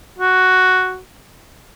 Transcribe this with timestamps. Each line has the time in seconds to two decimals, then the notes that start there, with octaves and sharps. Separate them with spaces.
0.18 F#4